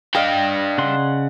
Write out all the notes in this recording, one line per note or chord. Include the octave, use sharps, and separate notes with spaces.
D4 D5 D#5 F5 G5
C#3 F#5 C6